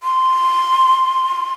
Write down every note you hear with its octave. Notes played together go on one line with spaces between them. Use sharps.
C6